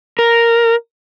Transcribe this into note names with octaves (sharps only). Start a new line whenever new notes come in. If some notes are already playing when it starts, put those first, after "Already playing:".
A#4